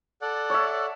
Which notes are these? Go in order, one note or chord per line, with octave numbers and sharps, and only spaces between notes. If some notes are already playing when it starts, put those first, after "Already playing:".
A4 D5 F#5
C#5 E5